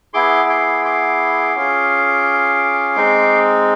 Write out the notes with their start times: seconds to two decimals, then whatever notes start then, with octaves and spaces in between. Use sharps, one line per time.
0.14 B3 E4 G#4 C6 D6
0.49 C6 D6
0.85 C6 D6
1.55 C#4 F4 G#4
2.96 G#3 C4 D#4